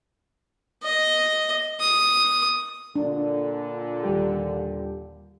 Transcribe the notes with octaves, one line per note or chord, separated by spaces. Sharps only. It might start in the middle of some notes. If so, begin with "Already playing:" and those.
D#5
D#6
A#2 D3 D4
D#2 G3 G4